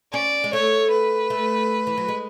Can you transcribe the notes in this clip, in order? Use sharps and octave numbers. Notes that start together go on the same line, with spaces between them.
C#4 D5
G#3
A3 C#5
B4
A3
E3
F#3
G#3